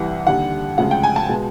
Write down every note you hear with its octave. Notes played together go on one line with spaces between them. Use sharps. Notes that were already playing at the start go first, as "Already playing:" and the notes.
Already playing: C2 C3 E3 F#5
D#2 D3 G3 F#5
D2 C#3 F3 G#3 F#5
G5
G#5
A5
B2 G#3